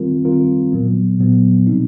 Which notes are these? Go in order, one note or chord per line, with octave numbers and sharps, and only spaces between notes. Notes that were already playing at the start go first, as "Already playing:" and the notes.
Already playing: D#3 G3 C4 F4 A#4
D#3 G3 C4 F4 A#4
A#2 F#3 B3
A#2 F#3 B3
B2 G3 C4 D#4